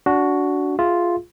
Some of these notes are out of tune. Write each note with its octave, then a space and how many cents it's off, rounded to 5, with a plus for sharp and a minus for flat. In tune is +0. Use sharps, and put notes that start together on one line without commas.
D4 -20 F#4 +0
F4 +0 G#4 +0 E5 +0